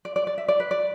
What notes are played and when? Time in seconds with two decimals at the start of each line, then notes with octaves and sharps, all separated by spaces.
0.05 D5
0.16 D5
0.27 D5
0.38 E5
0.48 D5
0.60 B4
0.71 D5